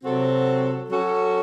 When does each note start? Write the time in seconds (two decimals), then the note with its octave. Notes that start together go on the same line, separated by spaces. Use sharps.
0.02 C3 F#3 C4 F#4 A4
0.90 F#3 C#4 F#4 A4